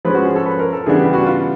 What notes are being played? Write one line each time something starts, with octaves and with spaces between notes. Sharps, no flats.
F3 G#3 C#4 B4
F#4
G#4
A4
B4
A#4
A4
C#3 E3 G3 B3 D4 G#4
G4
F#4
F4